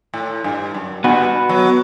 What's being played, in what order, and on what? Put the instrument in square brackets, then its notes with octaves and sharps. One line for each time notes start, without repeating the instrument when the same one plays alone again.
[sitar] A2
G2
F#2
[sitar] G2 [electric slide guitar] B3 F#4 B4
[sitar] F#3